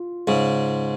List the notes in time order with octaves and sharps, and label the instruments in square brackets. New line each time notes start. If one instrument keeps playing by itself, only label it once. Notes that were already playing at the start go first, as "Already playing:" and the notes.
Already playing: [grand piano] F4
[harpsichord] G#2 C#3